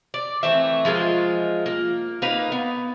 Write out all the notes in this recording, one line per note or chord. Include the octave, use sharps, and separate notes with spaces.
D5
E3 A3 C4 E5
F3 G#3 F4 A#4
A#3
A#3 D#4 B4 F5
B3